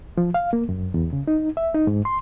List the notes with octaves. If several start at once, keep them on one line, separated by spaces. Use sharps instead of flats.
F3
F5
A#3
F#2
E2
C#3
D#4
E5
D#4
G#2
C6